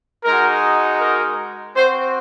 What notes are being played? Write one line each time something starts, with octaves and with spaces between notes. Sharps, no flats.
G#3 D#4 F#4 A#4
A#4
C4 F#4 C5